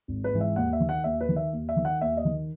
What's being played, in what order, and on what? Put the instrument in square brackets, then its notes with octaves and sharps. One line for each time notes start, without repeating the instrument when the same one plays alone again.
[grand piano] G#1
B4
G#2 E3
E5
D#2 F#5
E5
D#3
F#5
D#2 E5
B4
D#3
E5
D#2
E5
D#3
F#5
D#2 E5
D#5
D#3